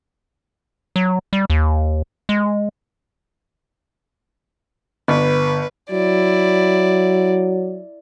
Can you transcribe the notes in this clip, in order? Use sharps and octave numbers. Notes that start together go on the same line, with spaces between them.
F#3
G3
D#2
G#3
G1 B4
F#3 E4 D5